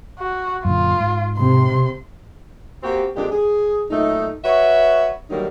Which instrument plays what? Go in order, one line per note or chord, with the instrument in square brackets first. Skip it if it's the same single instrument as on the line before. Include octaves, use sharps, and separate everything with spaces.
[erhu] F#4
[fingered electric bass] F#2 A#2 D3 [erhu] F4
[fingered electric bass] G#2
[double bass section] C3 [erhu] C6
[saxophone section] A#3 C4 F#4 G4
F2 A#2 G#3 D4 G4
G#4
A#2 F#3 A3 D#4
F#4 B4 C#5 E5
D3 D#3 F#3 G3 A#3 D#4